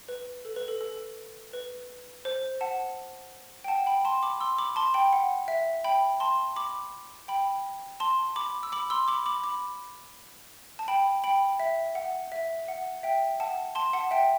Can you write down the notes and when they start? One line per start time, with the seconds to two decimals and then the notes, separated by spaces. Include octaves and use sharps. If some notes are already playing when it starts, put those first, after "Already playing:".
0.09 B4
0.45 A4
0.56 B4
0.68 A4
0.81 A4
1.53 B4
2.25 C5
2.61 F#5 A5
3.64 G5
3.68 F#5 A5
3.86 G5 B5
4.05 A5 C6
4.23 B5 D6
4.40 C6 E6
4.58 B5 D6
4.76 A5 C6
4.94 G5 B5
5.13 F#5
5.48 E5
5.84 G5 B5
6.20 A5 C6
6.56 B5 D6
7.28 G5 B5
8.00 A5 C6
8.36 B5 D6
8.63 E6
8.72 B5 D6
8.90 C6 E6
9.08 B5 D6
9.26 B5 D6
9.44 B5 D6
10.79 A5
10.88 G5 B5
11.24 G5 B5
11.60 E5
11.95 F#5
12.32 E5
12.68 F#5
13.03 E5 G5
13.40 F#5 A5
13.75 A5 C6
13.93 F#5 A5
14.11 E5 G5